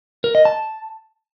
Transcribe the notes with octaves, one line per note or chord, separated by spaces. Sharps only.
A#4
D#5
A5